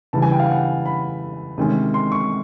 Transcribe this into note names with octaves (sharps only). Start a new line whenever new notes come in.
C#3 E3 G3 A5
G#5
G5
F5
F#5
B5
C3 D#3 G#3 C#4
C6
C#6